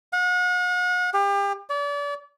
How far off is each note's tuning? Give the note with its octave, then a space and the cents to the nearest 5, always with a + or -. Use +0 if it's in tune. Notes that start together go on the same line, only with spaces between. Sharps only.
F#5 -40
G4 +35
D5 -35